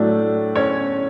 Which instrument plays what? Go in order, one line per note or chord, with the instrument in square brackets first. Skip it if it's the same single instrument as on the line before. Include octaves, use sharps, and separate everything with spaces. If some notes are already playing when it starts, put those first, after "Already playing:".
Already playing: [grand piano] A2 F#3 A3 D4
C#4 C#5